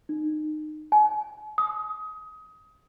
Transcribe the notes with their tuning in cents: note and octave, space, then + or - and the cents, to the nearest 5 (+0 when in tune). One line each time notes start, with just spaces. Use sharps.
D#4 -25
G#5 +45
D#6 +25